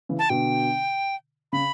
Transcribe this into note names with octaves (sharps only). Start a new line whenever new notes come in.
C#3 E3
A5
B2 D3 G5
C#3 B5